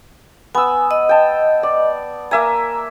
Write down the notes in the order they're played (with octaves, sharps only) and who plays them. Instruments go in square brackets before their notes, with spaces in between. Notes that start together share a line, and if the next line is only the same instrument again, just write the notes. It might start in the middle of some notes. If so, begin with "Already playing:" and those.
[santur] B3 E6 [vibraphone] G#5
[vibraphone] D#5
[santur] G5 A5
D5
[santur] A#3 E5 G#5 [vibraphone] A#5